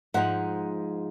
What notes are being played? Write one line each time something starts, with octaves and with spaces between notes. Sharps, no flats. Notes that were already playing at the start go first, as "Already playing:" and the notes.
G#2 F3 G#3 D#4 F#5